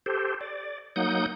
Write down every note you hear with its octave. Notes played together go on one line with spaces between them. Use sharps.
G4 A4 C5
D5
F#3 A#3 D#4 F#5 D#6 G6